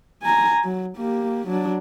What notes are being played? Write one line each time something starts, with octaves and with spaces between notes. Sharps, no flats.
G#5 A#5
F#3
A#3 G4
F#3 D4